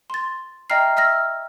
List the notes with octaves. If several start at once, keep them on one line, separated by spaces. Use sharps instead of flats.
C6 A6
D#5 E5 G5 A#5 F6 C7
E5 E6 F6 A#6